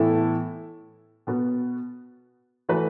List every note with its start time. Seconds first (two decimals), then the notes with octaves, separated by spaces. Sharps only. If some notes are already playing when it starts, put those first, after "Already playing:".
Already playing: A2 E3 B3 E4 A4
1.27 B2 B3 F#4
2.69 E3 A3 F#4 B4